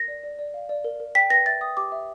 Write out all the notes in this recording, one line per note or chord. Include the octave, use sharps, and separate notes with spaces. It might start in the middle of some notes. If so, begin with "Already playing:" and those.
Already playing: A#4 A#6
D5
D5
D5
F5
D5
A#4
A#4
G5 B6
B4 A#6
E5 A6
G5 D#6
G4 D6
E5